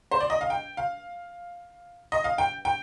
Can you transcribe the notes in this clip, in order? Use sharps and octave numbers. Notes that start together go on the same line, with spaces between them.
C5
D5
D#5
F5
G5
F5
D#5
F5
G5
G5